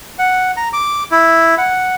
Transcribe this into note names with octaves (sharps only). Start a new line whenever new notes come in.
F#5
A#5
D6
E4
F#5